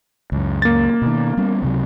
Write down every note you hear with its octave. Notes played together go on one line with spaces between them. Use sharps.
C#2 F#2
A#3 A6
B2 D#3
G3 B3 C#4
C#2 C3 F#3